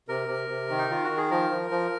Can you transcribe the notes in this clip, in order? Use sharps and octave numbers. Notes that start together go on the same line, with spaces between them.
C3 A#4
C3
C3
D#3
D#4
D#3 F4
F#4
D#3
G#4
F3 A#4
F3
F3